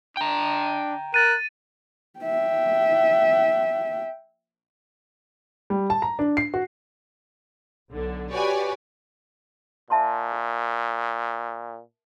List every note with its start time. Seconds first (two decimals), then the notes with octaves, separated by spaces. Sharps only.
0.17 D4 G5 A#5
1.14 A#4 F#6 A6 D#7
2.19 E5 G5
5.70 G3
5.90 A5
6.02 A#5
6.19 D4
6.37 C7
6.54 F#4
7.91 B1 D3
8.31 F#4 G4 B4 C#5 D5 G#5
9.90 A#2 E5 A5 C6
10.33 A#4